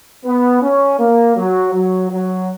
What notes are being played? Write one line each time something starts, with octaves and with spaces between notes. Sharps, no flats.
B3
C#4
A#3
F#3
F#3
F#3